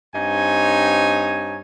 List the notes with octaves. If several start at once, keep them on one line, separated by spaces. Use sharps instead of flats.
G2 C4 D#4 C#5 G#5